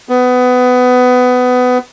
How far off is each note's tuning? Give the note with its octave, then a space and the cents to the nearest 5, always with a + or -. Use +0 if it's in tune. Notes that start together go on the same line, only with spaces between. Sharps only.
B3 +20